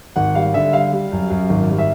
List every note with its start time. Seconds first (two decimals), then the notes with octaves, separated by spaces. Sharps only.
0.16 G#1 F#5
0.35 G3 F5
0.54 D3 E5
0.73 G3 F5
0.92 G3
1.12 F#2
1.30 F#2
1.49 G#1
1.70 G3
1.79 E5